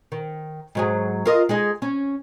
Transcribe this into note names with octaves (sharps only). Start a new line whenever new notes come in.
D#3
G#2 F#3 G#4
F4 A#4 D#5
G#3 D#4 G#4
C#4